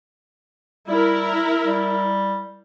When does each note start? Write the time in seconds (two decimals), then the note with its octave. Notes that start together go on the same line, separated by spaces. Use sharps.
0.88 G3 E4 A#4
1.65 G3